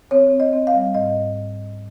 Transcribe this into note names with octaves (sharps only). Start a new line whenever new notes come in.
C4 C#5
C4
D#5
C4
F5
G3
G#2 D#5